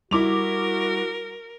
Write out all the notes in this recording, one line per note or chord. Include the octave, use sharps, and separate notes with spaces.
G3 E4 F#4 A#4 D6 F7